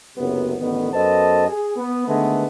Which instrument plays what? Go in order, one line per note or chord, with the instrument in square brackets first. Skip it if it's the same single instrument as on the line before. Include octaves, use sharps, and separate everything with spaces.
[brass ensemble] F#1 C#2 C3 F#3 B3
A1 D3 D#3 B3
F#2 B3 A4 C5 D#5 A5
G#4
B3
D3 D#3 G#3 A3 B3